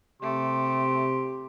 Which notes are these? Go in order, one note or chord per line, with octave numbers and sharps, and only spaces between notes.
C3 A3 G4 C6